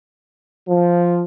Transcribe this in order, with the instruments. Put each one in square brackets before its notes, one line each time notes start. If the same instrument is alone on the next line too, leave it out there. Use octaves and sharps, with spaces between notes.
[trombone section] F3